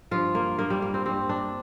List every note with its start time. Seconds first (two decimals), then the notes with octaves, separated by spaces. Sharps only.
0.11 G2 F3 F4
0.35 A#3
0.58 G2 F3 A#3
0.70 G3
0.82 A#3
0.94 C4
1.06 G2 G3 C4
1.29 D4